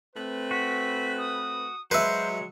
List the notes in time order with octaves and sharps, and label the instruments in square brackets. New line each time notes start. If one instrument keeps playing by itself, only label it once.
[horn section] A3 C4 B4
[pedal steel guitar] F#4 [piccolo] B6
[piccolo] D#6
[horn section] F#3 G#3 [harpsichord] B4 E5 [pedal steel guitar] C5 [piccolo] C#7